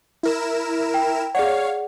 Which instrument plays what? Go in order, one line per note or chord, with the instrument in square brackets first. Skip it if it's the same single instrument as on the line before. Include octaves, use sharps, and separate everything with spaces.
[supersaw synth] E4 A#4 E7
[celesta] G5
[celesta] G#4 D5 F#5 [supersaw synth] C#5 F5